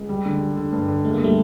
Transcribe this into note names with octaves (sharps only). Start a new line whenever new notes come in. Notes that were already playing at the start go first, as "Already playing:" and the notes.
Already playing: C#2
G3
D3
G3
D3
G2
D3
C#2 A3
A#3
G3 A3